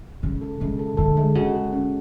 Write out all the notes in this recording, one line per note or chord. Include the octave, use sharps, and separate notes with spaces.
C#3 G#3
A4
C#3 G#3
A4
D3 A4
G#3
C#3 F#4
G#3
C#4